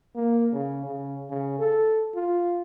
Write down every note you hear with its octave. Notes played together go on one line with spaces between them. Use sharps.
A#3
C#3
C#3
C#3
A4
F4